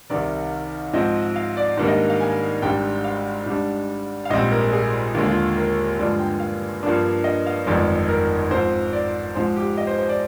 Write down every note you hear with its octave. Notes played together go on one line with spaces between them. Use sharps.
C2 C3 D#3 D5
G#2 F3 C4 D#5
F5
D5
G#2 D#3 G3 A#3 D4
D#5
F5
G#5
G#1 G#2 G3 D4 G5
F5
G#2 G3 D4
F5
A#1 G#2 G3 C4 D#5
A#4
G#4
D#2 D3 G#3 F4
F4
A#4
G2 D3 F3 G#3 D5
G5
F5
G2 F3 A#3 D4
D#5
F5
G1 F2 D#3 G#3 D5
A#4
G#2 F3 C4 C5
D5
G#2 F3 G#3 C5
G4
D#5
C5
C5
D5